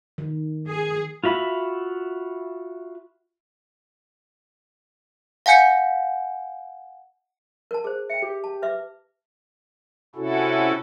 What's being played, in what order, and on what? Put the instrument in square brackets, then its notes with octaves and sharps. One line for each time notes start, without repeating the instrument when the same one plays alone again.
[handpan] D#3
[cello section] G#4
[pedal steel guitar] F4 F#4 E5 B5
[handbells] F5 F#5 G#5 G6 C#7
[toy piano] A#4 A5
G#4 C5
[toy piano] E5 G5 [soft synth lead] C#7
[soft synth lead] G4
[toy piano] A5
B4 E5 D6
[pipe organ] C3 C#4 E4 F#4 A4